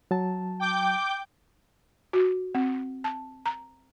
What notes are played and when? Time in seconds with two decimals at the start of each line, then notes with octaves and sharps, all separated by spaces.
0.11 F#3 A5
0.60 G5 D6 G6
2.13 F#4
2.55 C4
3.04 A5
3.46 A#5